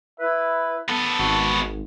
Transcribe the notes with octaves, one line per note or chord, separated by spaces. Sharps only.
E4 B4 E5
B3 A4 A5
G#1 F#4